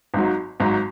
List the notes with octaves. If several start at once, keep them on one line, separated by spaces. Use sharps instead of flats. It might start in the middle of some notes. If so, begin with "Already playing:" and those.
G#1 G#2 F#3
G#1 G#2 F#3